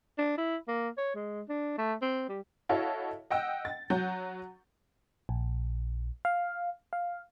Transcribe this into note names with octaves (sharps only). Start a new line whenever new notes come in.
D4
E4
A#3
C#5
G#3
D4
A3
C4
G3
E4 F#4 A4 C#5 D#5 F5
D#5 F#5 G5 E6
A6
F#3 F#5 G6
A#1
F5
F5